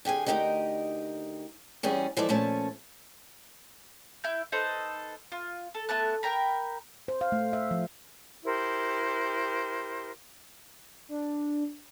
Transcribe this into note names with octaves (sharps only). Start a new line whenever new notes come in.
D3 G4 G#4 G#5
D2 D#3 D#4 G4 A#4 D#5
E2 G3 C#4 G#4
E3 F3 G#3 A4 D5
A#2 F3 A3 C#4 A5
E4 G6
D#4 A4 B4 C5
F4
A4
A3 B3 A5 F#6
A#4 G5 A#5 B5
C5
F5
A3
E5
F3
E4 G4 A#4 C5
D4